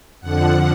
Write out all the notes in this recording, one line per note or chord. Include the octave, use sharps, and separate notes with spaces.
F2 D3 F3 F#5